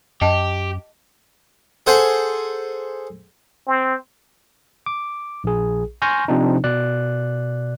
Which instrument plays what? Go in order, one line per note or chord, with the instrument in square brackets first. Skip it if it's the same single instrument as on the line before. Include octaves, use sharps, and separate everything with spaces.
[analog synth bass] F#2 [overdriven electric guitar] G4 [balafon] D#5 A5
[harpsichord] G#4 A4 C5 F#5 G#5
[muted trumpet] C4
[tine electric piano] D6
A#1 G#4
G#5 C6 C#6 F6 G6 A#6
C3 F3 C4 D4 D#4
B2 D5 F#6